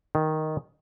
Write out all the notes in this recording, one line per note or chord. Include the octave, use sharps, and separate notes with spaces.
D#3